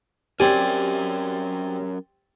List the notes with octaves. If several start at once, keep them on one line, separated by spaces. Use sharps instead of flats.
F#3 C4 C#4 G4 A#4 D5 G#5